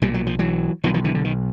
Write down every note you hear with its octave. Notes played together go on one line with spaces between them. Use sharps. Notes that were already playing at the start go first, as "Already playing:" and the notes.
B1 A#2 G3
F#3
F3
E3 F#3
B1 B2 D#3 F3
D#3 F3
D3 E3
D3
D#3